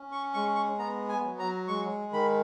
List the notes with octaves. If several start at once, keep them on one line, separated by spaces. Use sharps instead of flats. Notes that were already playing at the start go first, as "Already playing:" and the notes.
Already playing: C#4
C#6
G#3 C#6
C#6
B3 A#5
G#5
F#3
A#5
G#3 C#6
D#3 B5